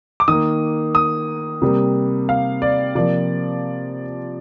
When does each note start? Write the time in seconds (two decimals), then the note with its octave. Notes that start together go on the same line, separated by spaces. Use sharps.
0.20 D6
0.28 D#3 A#3 D#6
0.95 D#6
1.62 C3 G3 A#3
2.29 F5
2.62 D5
2.95 C3 F3 A#3 D5